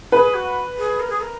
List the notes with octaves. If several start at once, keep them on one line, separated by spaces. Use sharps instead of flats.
G#4 B4
F#4
G#4
A#4
G#4
A#4